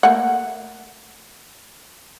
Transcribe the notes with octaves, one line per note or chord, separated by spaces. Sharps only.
A3 A#3 F#5